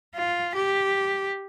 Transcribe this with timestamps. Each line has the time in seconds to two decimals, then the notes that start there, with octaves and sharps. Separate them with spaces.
0.15 F4
0.55 G4